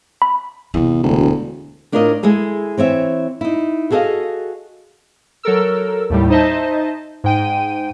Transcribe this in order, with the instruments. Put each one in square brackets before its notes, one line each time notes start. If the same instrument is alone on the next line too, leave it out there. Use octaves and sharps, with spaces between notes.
[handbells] B5
[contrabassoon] E2 [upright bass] C3 E3
[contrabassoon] E1 [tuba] D2
[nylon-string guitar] A2 D4 F4 A#4 D5 D#5
G#3 E4 G#4 A4
E3 C4 C#5 E5
D#4 E4
F#4 G#4 A4 C#5 D#5 F5
[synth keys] F#3 A4 A#4 E6
D#2 A2 G3
D#4 C5 D#5 E5 A5
G#2 G5 D#7